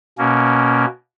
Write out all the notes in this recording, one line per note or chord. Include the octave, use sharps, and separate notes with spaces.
B2 A#3 C#4